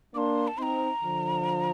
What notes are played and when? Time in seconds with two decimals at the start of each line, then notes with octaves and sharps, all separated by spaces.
0.14 A#3 D4 D6
0.18 C6
0.48 A5
0.58 C4 D#4 A#5 C6
1.03 D3 F3